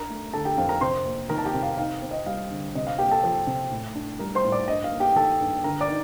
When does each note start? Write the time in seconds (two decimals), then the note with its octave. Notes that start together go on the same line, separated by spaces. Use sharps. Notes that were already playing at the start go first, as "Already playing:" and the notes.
Already playing: D4 A#4 A#5
0.10 A3
0.33 D3 A4 A5
0.45 G4 G5
0.58 F2 F5
0.69 A#4 A#5
0.81 C3 C5 C6
1.05 A#3
1.29 D#3 A#4 A#5
1.38 A5
1.45 G4 G5
1.54 C3
1.63 F5
1.78 D#4 F5
2.02 C4
2.11 D#5
2.26 G3 F5
2.50 D3
2.75 C3 D#5
2.87 F5
2.98 A#3 G4 G5
3.11 A4 A5
3.23 F3
3.47 C3
3.71 A2
3.95 D4
4.19 G3 A#4 A#5
4.35 C5 C6
4.44 A2
4.52 D5 D6
4.68 G2 D#5
4.84 F5
4.92 A#3
5.00 G4 G5
5.16 D#3 A4 A5
5.40 G2
5.64 D3 A#4 A#5
5.81 D5 D6
5.88 D#4